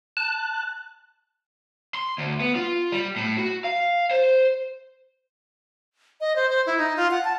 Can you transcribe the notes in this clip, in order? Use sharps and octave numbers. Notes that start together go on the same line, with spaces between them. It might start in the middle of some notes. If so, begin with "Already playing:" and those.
A5 F#6
C6
D2
B3
F4
G3
A2
F#4
F5
C5
D#5
C5
C5
E4
D#4
F4
F#5
A5